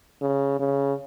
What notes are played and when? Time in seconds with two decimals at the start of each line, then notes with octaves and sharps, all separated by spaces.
0.22 C#3
0.60 C#3